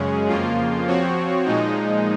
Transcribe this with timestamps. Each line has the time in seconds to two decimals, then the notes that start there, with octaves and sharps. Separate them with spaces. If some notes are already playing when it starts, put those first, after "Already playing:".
Already playing: F#2 C#3 G#3 C#4 G#4
0.28 F2 C#3 F3 A#3 F4
0.87 F3 C4 F#4 C#5
1.45 A#2 F3 G#3 D#4